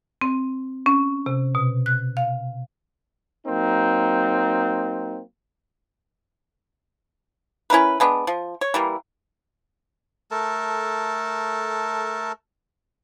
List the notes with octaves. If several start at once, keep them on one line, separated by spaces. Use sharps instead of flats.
C4
C#4
C3
B2
F#6
F5
F#3 A#3 C4 D#4
C#4 E4 A#4 B4
G#3 B3 D4
F3
C#5
E3 G3 A#3
A3 A4 A#4 A5